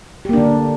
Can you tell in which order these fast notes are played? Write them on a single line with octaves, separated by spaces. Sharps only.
G4 A#3 D4 D3